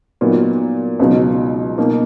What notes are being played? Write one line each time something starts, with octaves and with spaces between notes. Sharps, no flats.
A#2 F#3 B3 D#4
C#2 B2 F#3 B3 D#4
B2 A#3 D#4